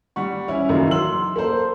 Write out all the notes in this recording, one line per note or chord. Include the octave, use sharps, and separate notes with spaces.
G3 F#5 C#6
E3 C#4 E4
C#2 F#2 D#3 E3 F#3 A#3
F#3 C6 E6 F#7
A#3 A4 C5